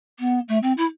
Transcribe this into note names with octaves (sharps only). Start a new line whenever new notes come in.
B3
A3
C4
E4